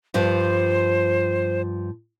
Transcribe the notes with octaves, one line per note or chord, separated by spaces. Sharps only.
G2 F3 G3 C5